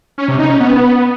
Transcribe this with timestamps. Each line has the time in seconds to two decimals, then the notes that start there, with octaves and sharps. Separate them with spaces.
0.18 C#4
0.28 C3
0.39 D#4
0.50 C#4
0.60 B3